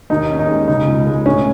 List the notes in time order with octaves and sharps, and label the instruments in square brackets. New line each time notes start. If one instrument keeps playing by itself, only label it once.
[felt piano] D#2 [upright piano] D#4
[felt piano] C#4
[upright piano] D#4
[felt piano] G#3
[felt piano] C#3 [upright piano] D#4
[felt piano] C#2
G#3
[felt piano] A2 [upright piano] C#4